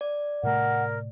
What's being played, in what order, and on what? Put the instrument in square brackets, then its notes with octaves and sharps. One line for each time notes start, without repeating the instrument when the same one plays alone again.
[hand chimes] D5
[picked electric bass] A2 C3 A3 [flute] A#4 [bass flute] F#5